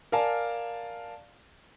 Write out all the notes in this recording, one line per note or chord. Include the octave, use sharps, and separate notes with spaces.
A#4 D5 F5 G#5 A5